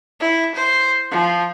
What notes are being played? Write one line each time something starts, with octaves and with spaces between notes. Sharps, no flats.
E4
C5
F3